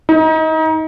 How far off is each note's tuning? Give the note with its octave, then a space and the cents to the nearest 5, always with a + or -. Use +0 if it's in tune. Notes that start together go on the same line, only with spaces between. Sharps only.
D#4 +30